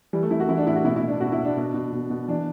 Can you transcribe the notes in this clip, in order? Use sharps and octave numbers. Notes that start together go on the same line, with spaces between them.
E3 G3
A3
E3 E4
F#4
E3 E4
D4
A2 E4
F#4
B2 E4
E4
B2
D4
B2 F#4
E4
B2
D4
B2
B2
B2
B2
E3 D4